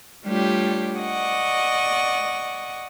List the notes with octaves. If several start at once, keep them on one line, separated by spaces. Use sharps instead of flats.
G3 A3 D4 F4 G4 C#5
D5 D#5 F#5 C#6